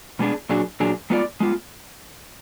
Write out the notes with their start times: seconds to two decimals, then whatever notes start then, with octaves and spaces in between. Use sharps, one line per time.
0.19 B2 G#3 B3 D4 G#4
0.49 A#2 F#3 D4 G#4
0.80 A#2 F#3 D4 G#4
1.10 G#3 B3 F4 B4 D5
1.40 G#3 B3 F4